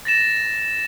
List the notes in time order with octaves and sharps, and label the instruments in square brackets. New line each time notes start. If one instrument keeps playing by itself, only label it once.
[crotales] A6 A#6 E7